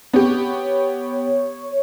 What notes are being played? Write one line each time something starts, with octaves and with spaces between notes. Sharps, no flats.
B3 G4 C#5